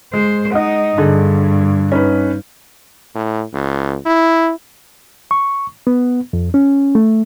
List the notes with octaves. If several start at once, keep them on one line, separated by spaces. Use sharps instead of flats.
G#3 C5
G#3 D#4 D#5 F#5
G2 D3 G#4
C#4 D#4 B4
A2
C#2
E4
C#6
B3
F2
C#4
A3